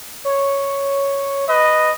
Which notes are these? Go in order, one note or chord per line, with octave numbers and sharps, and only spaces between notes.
C#5
B4 D#5